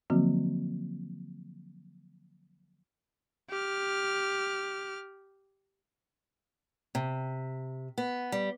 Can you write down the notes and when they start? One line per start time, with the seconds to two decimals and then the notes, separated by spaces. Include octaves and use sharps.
0.10 D3 F3 F#3 A#3 C4 F#4
3.50 G4 F6
6.95 C3
7.98 B3
8.32 G3